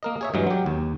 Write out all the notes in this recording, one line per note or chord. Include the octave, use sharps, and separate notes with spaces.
A#3 A#4 D#5
G#4 C#5 E5
G2 E3 F#3 G#3
F#3 G4
D#2